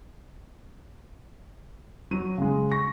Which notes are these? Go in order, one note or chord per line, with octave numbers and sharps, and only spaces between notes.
F#3 D#7
C#3 G#3
C#6 A#6